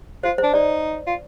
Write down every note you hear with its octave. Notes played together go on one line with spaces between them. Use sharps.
F4 C5
C5
D4
D#4 D5
F4